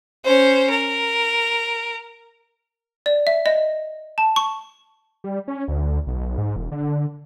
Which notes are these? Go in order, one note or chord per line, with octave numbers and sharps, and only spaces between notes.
C#4 C5
A#4
D5
E5
D#5
A5
C#6
G3
C#4
D2
B1
G#2
E1
D3